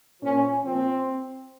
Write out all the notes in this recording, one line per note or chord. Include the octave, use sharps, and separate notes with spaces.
A#2 F3 C#4
A#2 F3 C4